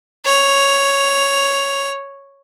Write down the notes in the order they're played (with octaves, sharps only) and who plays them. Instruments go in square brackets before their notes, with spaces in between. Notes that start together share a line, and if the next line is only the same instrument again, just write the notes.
[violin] C#5 F7